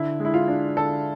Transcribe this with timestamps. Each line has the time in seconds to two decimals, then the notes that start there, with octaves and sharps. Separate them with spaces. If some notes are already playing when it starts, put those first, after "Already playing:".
Already playing: D3 E4
0.20 G#3 E4
0.34 F4
0.48 D4
0.77 D3 A4